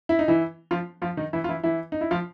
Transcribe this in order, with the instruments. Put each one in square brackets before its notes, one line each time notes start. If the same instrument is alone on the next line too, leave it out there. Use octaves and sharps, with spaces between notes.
[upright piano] E4
D#4
E3 E4
F3 F4
F3 F4
D#3 D#4
E3 E4
F4
E3 E4
E3 E4
D#4
E4
F3 F4